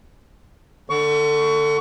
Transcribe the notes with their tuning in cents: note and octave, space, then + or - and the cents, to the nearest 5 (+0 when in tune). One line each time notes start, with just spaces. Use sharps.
D3 +20 C#6 +25